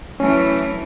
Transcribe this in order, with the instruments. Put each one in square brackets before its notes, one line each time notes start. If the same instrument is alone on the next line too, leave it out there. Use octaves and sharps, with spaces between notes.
[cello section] E3 F#3 A3 [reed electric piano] C#4